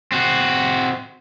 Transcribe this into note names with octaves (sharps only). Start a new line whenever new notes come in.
C4 F#4